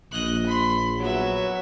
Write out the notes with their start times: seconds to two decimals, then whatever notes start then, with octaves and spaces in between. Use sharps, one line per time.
0.11 A#1 D#5 F#6
0.46 B5 C6
0.99 F#3 B3 E5